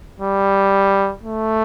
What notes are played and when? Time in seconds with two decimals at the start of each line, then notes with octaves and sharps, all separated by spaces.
0.20 G3
1.23 A3